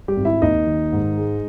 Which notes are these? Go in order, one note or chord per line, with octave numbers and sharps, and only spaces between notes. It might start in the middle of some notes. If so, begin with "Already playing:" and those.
G3 G4
G#1
E4 E5
D#2 D#4 D#5
D#3
G#2
G#3